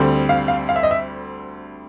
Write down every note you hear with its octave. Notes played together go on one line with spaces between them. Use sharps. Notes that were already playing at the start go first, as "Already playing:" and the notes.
Already playing: D2 D3 G3 C4
F5
F5
F5
E5
D#5
E5